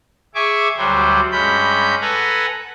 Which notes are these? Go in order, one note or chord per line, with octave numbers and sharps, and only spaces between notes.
G#4 E5 G#5 C#6 D6
D2 F#3 G3 C5
G2 G#3 C#4 B5 G6
A4 B4 F#5 G#5 A#5